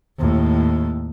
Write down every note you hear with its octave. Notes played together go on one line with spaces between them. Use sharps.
D#2 A2